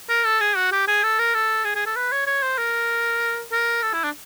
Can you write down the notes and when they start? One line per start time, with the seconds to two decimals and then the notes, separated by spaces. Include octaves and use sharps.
0.09 A#4
0.25 A4
0.41 G#4
0.56 F#4
0.72 G4
0.87 G#4
1.03 A4
1.19 A#4
1.34 A4
1.65 G#4
1.75 G#4
1.86 A4
1.96 B4
2.12 C#5
2.27 C#5
2.43 C5
2.58 A#4
3.52 A#4
3.82 A4
3.93 E4
4.04 D4